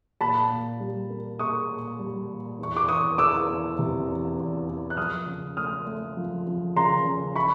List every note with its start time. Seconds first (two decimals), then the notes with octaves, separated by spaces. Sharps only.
0.21 A#2 A5 B5
0.50 A#2
0.80 G3
1.10 A#3
1.39 A#3 C#6 D#6
1.69 A#2
1.99 G3
2.29 A#2
2.59 E2 C#6
2.77 D6
2.88 E2 C#6 D#6
3.18 E3 D6 E6
3.49 E2
3.79 C3
4.08 E2
4.38 E2
4.68 E2
4.90 F#6
4.97 F3 D#6 F6
5.27 C#3
5.57 A3 D#6 F6
5.87 A3
6.17 F3
6.47 F3
6.76 C#3 A#5 C6
7.06 C#3
7.36 B5 C#6